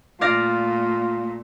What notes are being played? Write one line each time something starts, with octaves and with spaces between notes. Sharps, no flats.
A#2 A3 F4 D5 F5 A#6